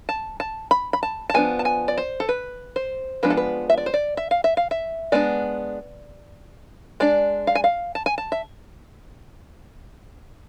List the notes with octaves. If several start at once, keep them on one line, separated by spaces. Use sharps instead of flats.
A5
A5
B5
B5
A5
A5
F3 B3 D4 G#5
A5
G#5
D5
C5
A4
B4
C5
F3 G#3 B3 D4 B4
A4
B4
E5
D5
C5
D5
E5
F5
E5
F5
E5
G#3 B3 D4 D5
G#3 D4 D5
F5
G#5
F5
A5
G#5
A5
E5